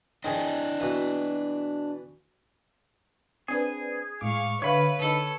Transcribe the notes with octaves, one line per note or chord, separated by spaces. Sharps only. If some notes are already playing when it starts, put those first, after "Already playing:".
D4 D#4 G#4 D#5 G5
B2 E3
C4 D4 G#4 B4
A2 G#3 F5 C#6 D6
D3 B4 C#5 E5 F5 B5
D3 D#4 A4